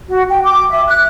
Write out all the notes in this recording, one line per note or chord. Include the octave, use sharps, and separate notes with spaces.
F#4
G5
D6
E5
F#6